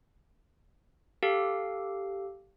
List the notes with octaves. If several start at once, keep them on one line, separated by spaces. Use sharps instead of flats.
G4 A4 F5